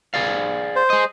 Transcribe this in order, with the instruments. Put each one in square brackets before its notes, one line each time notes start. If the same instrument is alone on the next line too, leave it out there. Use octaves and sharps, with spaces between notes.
[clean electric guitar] G#4 D5 F5
[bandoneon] C5
[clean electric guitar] G#4 D#5